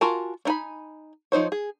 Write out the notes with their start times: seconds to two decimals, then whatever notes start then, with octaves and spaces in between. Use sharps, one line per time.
0.01 F4 F#4 A#4 G#5 A5
0.45 D4 D#4 G#5 B5
1.32 F3 D#4 C5 C#5
1.52 G#4